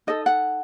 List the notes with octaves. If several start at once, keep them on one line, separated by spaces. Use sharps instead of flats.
D#4 A4 D#5
F#5